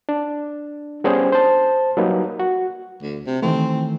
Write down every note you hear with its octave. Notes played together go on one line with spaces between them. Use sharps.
D4
G3 B3 C#4 D4 G#4 C5
C5 A5
F#3 G3 A#3 D#4 B4
F#4
D2
C3
D#3 E3 A3 C4